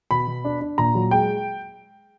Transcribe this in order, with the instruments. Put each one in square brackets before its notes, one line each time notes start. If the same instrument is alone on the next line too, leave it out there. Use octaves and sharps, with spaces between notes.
[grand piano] B2 B5
B2
D4
D4
A#2 A#5
F#3
G#3 G5